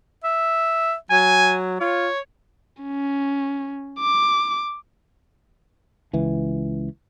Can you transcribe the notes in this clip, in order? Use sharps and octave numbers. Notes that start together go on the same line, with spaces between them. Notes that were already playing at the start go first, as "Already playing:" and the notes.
E5
F#3 G#5
F4 C#5
C#4
D6
C#2 E3